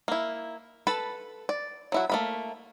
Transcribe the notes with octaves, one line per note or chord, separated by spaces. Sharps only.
A#3 E4
A4 B4 A5 B5
D5
F#3 E4 F#4
A3 A#3 B5